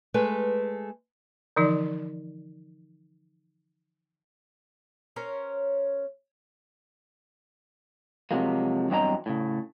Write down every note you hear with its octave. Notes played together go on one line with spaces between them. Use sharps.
G#3 A3 B4
D3 E3 F3 D#4 D5
C#4 A#4 C5 C#5
C3 F3 F#3 G#3 A#3
E2 G2 F#3 C4 D#5 A#5
A2 C#3